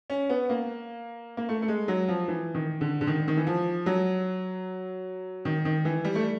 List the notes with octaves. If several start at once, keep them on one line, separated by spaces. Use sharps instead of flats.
C#4
B3
A#3
A#3
A3
A3
G#3
F#3
F3
E3
D#3
D3
D3
D#3
D#3
E3
F3
F#3
D#3
D#3
E3
G3
A3